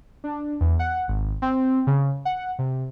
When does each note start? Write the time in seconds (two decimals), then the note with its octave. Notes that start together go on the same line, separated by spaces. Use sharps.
0.24 D4
0.61 E2
0.79 F#5
1.08 G#1
1.42 C4
1.87 C#3
2.25 F#5
2.59 C3